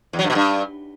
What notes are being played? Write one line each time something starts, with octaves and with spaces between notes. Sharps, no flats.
E2
F#3
G2
B2
G2